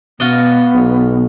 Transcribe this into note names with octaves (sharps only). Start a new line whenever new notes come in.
B2 B3 F4 F#4 D#5
B1